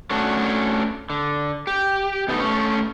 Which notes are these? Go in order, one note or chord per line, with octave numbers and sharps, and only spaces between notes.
A3 C#4 D4 F#4
D3
G4
B2 A3 B3 D#4
A3 C#4